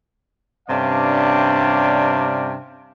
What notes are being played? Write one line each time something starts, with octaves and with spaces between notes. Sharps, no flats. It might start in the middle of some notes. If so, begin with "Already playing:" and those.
G2 C3 C#4 D4 D5 F5